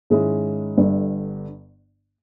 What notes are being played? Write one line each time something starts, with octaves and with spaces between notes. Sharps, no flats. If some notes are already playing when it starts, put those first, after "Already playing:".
G#2 D#3 G#3 C#4 E4
G1 G2 D3